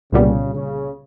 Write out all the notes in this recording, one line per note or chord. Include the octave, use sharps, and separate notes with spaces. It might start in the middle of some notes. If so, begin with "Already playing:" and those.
C2 A#2 C#3 G3 B3
C#3